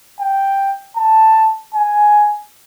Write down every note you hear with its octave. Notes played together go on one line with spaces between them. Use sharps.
G5
A5
G#5